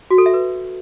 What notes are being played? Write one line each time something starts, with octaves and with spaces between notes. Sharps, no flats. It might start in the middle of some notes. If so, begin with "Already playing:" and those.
F#4
A4
E5
B4